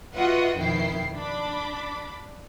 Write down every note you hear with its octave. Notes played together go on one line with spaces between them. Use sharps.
F4 F#4 B4 D#5 E5 F#5
F2 B2 D#3 E4 G5 C7
D4 B5 D6